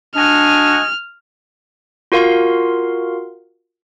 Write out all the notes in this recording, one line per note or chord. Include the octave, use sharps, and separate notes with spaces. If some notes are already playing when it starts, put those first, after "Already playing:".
D4 F#4 D#5 G#5 F6
F4 F#4 A#4 F5 C6